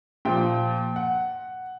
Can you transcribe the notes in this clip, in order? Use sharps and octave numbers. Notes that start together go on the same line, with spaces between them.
A#2 F3 G5
F#5